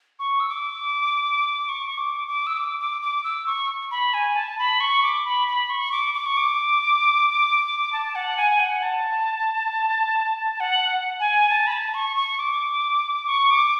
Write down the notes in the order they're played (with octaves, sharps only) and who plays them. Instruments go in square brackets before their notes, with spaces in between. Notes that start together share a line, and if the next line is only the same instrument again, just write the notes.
[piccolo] C#6
E6
D6
C#6
D6
D6
E6
D6
D6
D6
E6
C#6
B5
G#5
A5
B5
C#6
D6
B5
B5
C#6
D6
D6
C#6
D6
A5
F#5
G#5
F#5
A5
F#5
G#5
A5
B5
A5
C#6
C#6
D6
C#6
D6